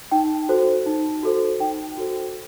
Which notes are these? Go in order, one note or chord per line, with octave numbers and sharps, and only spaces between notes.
D#4 G5
F#4 A4 C5
D#4
F#4 A4 C5
D#4 G5
F#4 A4 C5